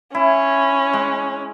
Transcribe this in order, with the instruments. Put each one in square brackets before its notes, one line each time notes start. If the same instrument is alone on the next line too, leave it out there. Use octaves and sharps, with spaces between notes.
[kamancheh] C#4 [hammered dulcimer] E4
[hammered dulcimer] G#3